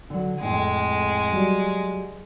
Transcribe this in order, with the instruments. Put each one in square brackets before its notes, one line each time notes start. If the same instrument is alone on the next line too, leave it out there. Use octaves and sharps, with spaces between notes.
[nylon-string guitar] D3 F#3
[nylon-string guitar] F2 A2 G5 [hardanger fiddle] G#3
[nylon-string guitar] F#3 G3